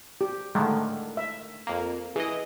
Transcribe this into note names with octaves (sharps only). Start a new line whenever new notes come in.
G4
A2 D3 D#3 G#3 A3
E5
F2 A#3
E3 G#4 D#5